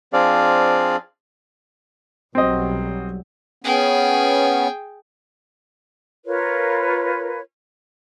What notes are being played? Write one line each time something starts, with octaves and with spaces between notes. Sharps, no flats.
F3 C4 D4 G#4 D5 F5
B1 F#3 G3 C4 D#5
B3 C#4 G#4 G5
F4 A#4 B4 C#5